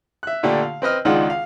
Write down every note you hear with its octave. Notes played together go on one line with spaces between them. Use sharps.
E5 F#6
A#2 D3 A3 D4 G4
F5
C4 B4 D#5 F6
C#2 D#3 G#3 D4 F4 F#5
F5